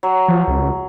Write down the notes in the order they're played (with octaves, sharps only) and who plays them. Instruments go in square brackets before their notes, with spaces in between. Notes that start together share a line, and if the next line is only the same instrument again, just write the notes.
[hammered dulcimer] F#3
[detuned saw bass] F3
C#2